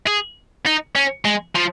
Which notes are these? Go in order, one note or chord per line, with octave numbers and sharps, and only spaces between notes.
G#4
D#4
C#4
G#3
F3